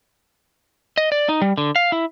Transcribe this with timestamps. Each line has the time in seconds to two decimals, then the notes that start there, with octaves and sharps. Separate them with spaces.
0.98 D#5
1.12 D5
1.29 D#4
1.42 G3
1.58 D3
1.76 F5
1.92 E4